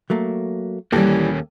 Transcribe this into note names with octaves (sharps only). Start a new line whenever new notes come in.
F#3 A3 A#3
D#2 E3 G3 A#3 C#4 G4 A4